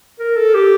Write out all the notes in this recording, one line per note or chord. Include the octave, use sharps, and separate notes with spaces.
A#4
A4
G4